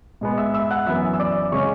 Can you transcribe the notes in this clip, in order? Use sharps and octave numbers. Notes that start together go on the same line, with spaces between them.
G#2 G#3 B3
E5 E6
E5 E6
F#5 F#6
F#2 E3 B3 E5 E6
E6
D5 D6
C#3 G#3 C#4 C#5 C#6